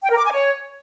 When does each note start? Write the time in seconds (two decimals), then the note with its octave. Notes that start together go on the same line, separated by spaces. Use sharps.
0.03 G5
0.11 A#4
0.18 D6
0.25 G#5
0.32 C#5